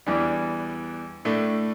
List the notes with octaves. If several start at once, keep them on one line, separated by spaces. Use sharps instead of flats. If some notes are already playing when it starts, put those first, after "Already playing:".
E2 E3 G3 D4
A2 A3 D4